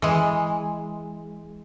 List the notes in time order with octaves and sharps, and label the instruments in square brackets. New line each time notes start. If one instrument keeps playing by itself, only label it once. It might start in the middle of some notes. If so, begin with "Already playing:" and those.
[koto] E3 G#3